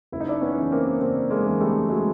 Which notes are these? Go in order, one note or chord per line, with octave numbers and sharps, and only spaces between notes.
F#1 E4
D#4
D4 E4
B3 C#4
E2 C#3
A#3 C4
F#1 A#3 C4
G#3 A#3
E2 C#3
G3 A3
F#3 G#3